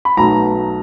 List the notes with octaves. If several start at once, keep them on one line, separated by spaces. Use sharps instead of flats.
B5
B1 B2 F#3 A3 A#5